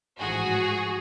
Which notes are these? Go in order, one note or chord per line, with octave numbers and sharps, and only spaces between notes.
A1 G#2 F3 F#4 G#4